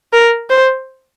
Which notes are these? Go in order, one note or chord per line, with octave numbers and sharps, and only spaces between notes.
A#4
C5